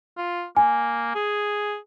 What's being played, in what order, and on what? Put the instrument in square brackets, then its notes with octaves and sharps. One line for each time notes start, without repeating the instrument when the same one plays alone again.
[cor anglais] F4
[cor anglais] A#3 [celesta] G#5
[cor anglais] G#4